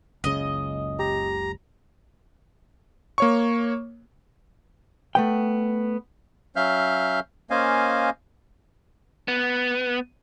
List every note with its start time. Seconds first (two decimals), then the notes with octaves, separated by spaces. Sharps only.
0.24 F#1 C#2 C#3 D#5
0.99 G4 A#5
3.18 A#3 C#5 C#6
5.15 A3 B3 G5
6.56 F#3 C#4 E5 F5 F6 G6
7.50 A#3 C#4 C5 D#5 F5 G#5
9.28 B3